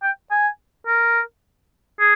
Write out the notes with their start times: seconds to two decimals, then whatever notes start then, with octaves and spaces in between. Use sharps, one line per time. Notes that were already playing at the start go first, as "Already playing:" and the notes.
0.03 G5
0.31 G#5
0.87 A#4
2.00 G#4